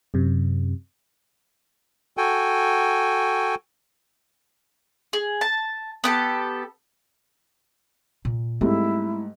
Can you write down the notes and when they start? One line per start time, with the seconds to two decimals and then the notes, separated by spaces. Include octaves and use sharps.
0.14 F#2 C3
2.17 F#4 A4 G5 G#5
5.13 G#4
5.41 A5
6.04 B3 G4 A4
8.25 A#2
8.61 G#2 G3 A3 C4 E4